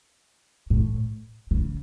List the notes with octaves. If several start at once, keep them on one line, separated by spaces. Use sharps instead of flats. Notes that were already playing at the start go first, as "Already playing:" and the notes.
A2
C#3